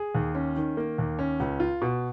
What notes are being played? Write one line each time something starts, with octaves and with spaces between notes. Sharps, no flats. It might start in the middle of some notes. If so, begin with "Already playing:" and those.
Already playing: G#4
D#2
C#4
D#3
A#3
D#2
C#4
C#2
F4
B2